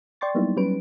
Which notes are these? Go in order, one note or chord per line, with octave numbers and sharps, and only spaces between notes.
D5 G5 C6 C#6 A6
F#3 G3 A#3 B3 D#4 E4
F#3 G3 C#4 B4 D7